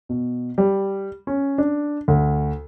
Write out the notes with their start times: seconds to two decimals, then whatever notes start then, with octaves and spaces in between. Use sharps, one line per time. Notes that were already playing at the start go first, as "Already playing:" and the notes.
0.09 B2
0.58 G3
1.27 C#4
1.58 D4
2.08 D2